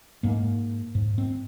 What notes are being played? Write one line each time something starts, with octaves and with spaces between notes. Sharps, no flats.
G#2 A#3
G#2
C4